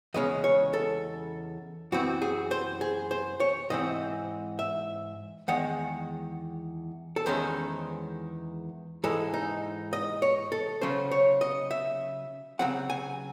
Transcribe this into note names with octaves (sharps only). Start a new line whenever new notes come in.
E2 C#3 G#3 C#4 D#5
C#5
A4
F#2 E3 C4 F#4
G#4
C5
G#4
C5
C#5
G#2 E3 C4 D#5
E5
E2 D#3 G#3 F#5
A4
E2 D#3 G#3 C#4 C5
G#2 E3 G#3 A4
D#4
D#5
C#5
A4
C#3 F#3 C#4 C5
C#5
D#5
E5
C#3 F#3 C4 F#5
G#5